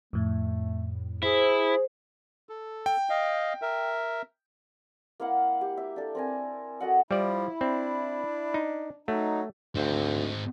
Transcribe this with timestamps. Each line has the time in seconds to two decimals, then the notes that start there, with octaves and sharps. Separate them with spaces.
0.13 F2 A2 A3
1.23 E4 G#4 C5
2.49 A4
2.86 G5
3.10 D#5 F5
3.62 A#4 E5
5.20 A#3 E4 F5 F#5
5.61 G4
5.77 E5
5.96 D4 A4
6.15 C4 A#4 G#5
6.80 F#4 A4 D#5 F#5
7.11 F3 G3 E4 D5
7.61 C4 D4
8.54 D#4
9.08 F#3 A3 D#4
9.75 D2 G#2 C4